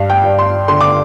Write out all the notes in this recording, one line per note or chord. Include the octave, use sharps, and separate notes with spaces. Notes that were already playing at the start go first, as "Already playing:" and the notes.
Already playing: G2 F5
G5
G2
C6
D3 C6
D6